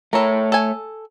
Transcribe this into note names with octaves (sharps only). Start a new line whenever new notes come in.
A3 A4 A#4 C#5
A4 G#5